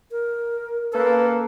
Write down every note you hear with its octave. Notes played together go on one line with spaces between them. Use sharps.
A#4
A#3 C#4 A4 B4